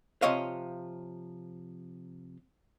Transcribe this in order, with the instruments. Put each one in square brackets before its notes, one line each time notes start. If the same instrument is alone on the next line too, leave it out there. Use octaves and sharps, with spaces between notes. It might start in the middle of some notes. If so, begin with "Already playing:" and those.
[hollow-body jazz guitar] C3 F3 C#5 D#5 F5